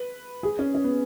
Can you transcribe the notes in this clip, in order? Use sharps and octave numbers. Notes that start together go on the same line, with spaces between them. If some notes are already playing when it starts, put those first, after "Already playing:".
Already playing: B4
G#4
C#4
C#4
B3